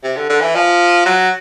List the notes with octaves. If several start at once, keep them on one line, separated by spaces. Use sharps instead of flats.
C3
D3
D3
E3
F3
F#3